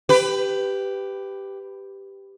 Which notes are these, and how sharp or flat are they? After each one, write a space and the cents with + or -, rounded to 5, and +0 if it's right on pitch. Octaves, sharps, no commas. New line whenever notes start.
G4 +0 B4 +15